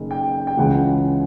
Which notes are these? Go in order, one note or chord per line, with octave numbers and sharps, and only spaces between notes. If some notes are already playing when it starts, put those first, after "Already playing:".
Already playing: F#1 D#3
G5
G5
C#2 C#3 E3 F#5